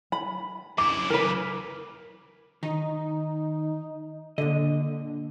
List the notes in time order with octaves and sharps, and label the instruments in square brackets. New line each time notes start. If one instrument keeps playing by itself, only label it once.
[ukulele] B5
[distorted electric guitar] F#2 E4 [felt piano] D6
[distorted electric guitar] C#3 E3 [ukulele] A#4 B4
[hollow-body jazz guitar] D#3 [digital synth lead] D#4
[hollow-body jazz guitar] A#2 D#5 [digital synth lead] D3